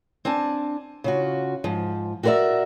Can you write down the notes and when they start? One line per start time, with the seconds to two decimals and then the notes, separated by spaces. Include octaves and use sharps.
0.25 C4 D4 G#5 A5
1.04 C#3 F4 F#4
1.64 G#2 F3
2.23 F#4 G4 A#4 C5 D5 E5